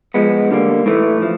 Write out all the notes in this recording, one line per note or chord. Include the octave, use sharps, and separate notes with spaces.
F3 G#3 B3
D3 G3 A#3
A2 E3 A3
F3